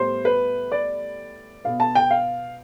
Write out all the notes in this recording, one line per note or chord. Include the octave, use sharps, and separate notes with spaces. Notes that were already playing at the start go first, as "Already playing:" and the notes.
Already playing: A2 G3 B3 C5
B4
D5
B2 B3 F5
A5
G5
F5